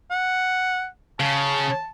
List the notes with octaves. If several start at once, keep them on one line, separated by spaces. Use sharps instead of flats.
F#5
C#3 A5